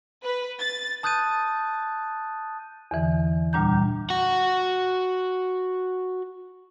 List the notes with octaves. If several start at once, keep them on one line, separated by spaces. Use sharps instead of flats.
B4
A6
A5 D#6 F#6 G6 A6 D#7
E2 D3 E3
D2 A#2 G3 D4 A#5 G6
F#4 F#5